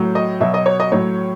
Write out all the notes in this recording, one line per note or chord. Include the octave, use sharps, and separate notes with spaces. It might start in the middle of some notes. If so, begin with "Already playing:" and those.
Already playing: A2 F#3
D#5
B2 F#3 E5
D#5
C#5
D#5
A2 F#3 C#5